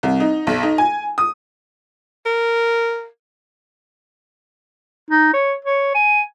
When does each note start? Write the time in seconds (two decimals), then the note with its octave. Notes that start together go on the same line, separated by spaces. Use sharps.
0.03 C2
0.20 D#4
0.47 B1
0.63 D#4
0.78 G#5
1.18 D#6
2.26 A#4
5.11 D#4
5.33 C#5
5.65 C#5
5.95 G#5